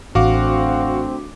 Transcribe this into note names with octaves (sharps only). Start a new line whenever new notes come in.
A1 D2 C4 F#4 F5 D6